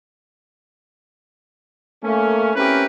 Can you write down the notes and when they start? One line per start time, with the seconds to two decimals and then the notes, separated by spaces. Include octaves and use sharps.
2.04 A3 A#3 C#4
2.55 C4 C#4 E4 G4 A#4 B4